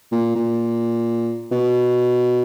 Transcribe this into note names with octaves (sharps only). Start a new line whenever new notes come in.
A#2
A#2
B2